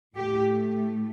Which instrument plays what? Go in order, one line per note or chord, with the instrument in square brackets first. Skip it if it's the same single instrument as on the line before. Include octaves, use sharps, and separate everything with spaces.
[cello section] A2 A3 G4